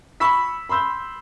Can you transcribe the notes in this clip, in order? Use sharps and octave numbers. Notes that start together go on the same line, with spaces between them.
B5 C#6 E6 B6
B5 C6 E6 G6